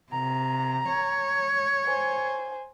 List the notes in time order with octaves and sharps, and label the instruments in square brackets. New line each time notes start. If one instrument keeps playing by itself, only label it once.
[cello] C3 [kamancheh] A#5
[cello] C#5
[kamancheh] C5 G#5